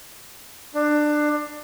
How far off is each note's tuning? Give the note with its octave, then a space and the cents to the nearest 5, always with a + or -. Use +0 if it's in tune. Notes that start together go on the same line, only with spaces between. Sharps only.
D4 +20